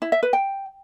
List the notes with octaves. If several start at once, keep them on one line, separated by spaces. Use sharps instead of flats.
E4
E5
B4
G5